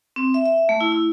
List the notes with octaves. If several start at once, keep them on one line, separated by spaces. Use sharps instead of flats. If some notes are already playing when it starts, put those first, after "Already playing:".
C4
E5
E5
A3
E4
E4